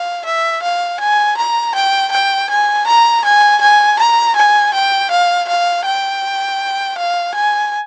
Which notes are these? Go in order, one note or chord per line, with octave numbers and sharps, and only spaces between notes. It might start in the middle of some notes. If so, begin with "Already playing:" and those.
Already playing: F5
E5
F5
G#5
A#5
G5
G5
G#5
A#5
G#5
G#5
A#5
G#5
G5
F5
F5
G5
F5
G#5